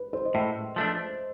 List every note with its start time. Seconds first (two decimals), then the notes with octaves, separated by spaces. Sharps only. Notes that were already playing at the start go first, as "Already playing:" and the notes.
Already playing: B4
0.13 C5
0.25 D#5
0.34 A2 E5
0.76 F3 A3 D4